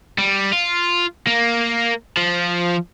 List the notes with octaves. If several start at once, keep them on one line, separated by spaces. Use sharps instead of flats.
G3
F4
A#3
F3